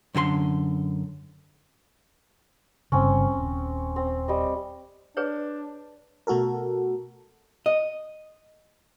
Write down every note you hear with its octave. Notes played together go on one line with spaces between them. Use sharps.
F#2 D3 G4 C6
G1 G2 C#3 C4 C#4
D#1
C4
G3 D#5
D4 G#4 B4 C#5
B2 A3 F#4 A4 A#4
D#5